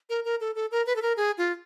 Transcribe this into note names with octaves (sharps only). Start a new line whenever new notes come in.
A#4
A#4
A4
A4
A#4
B4
A4
A#4
G#4
F4